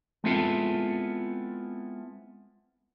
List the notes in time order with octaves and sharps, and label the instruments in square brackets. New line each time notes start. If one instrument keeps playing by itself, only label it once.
[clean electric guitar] G#3 B3 C4 E4 F4 A4